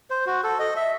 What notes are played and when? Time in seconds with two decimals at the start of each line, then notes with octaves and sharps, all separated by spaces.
0.10 C5
0.26 F#4
0.44 A4
0.59 D#5
0.76 E5